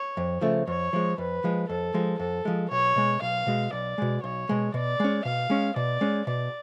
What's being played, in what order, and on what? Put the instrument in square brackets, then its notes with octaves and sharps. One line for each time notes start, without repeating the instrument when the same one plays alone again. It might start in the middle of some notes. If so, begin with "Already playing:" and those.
Already playing: [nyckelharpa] C#5
[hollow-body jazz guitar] F2
C#3 F3 A3
[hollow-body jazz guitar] F2 [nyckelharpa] C#5
[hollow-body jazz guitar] F3 G#3
[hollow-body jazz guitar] F2 [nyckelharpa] B4
[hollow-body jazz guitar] F3 G#3
[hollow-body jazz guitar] F2 [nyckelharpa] A4
[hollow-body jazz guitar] F3 G#3
[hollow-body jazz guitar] F2 [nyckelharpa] A4
[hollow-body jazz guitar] F3 G#3
[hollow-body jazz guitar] B1 [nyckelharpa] C#5
[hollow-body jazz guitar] B2 G#3
[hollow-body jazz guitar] B1 [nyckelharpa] F5
[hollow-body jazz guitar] B2 G#3
[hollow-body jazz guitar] B1 [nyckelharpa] D5
[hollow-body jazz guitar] B2 G#3
[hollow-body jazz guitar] B1 [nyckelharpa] C#5
[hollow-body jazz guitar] B2 G#3
[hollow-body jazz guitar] B2 [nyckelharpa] D5
[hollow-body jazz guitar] G#3 C#4
[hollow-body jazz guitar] B2 [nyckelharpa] F5
[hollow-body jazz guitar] G#3 C#4
[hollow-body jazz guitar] B2 [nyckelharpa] D5
[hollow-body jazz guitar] G#3 C#4
[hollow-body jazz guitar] B2 [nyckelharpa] D5